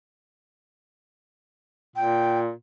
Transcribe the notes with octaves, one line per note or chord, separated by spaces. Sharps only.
A#2 G5